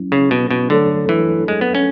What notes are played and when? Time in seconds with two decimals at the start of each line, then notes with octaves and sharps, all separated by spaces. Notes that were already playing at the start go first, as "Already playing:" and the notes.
Already playing: F#3 C#4 E4
0.12 C#3
0.31 B2
0.51 B2
0.70 D3 F#3 A3 D4 A4 C#5
1.09 E3
1.48 G#3
1.61 B3
1.75 C#4